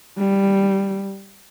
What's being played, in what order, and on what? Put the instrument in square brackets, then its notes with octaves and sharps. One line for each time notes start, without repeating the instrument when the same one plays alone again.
[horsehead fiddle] G3